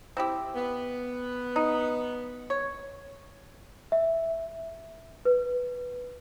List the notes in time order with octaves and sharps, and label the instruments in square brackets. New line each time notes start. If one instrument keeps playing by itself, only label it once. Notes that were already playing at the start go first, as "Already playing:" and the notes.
[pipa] C4 E4 G4
[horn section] B3
[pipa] D#4
C#5
[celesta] E5
[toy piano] B4